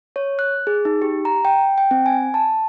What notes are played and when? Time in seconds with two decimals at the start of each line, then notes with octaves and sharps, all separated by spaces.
0.16 C#5
0.39 F#6
0.67 G#4
0.85 D#4
1.02 G4
1.25 A#5
1.45 G5
1.78 G5
1.91 C4
2.06 G#5
2.34 A5